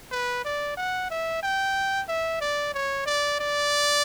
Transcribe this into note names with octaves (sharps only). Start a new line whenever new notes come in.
B4
D5
F#5
E5
G5
E5
D5
C#5
D5
D5